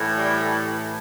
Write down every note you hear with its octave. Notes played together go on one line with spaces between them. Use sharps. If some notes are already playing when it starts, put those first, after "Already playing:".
Already playing: A2 E3
G3